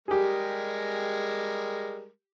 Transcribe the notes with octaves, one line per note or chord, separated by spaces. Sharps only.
G3 G#3 G4 G#4 A#4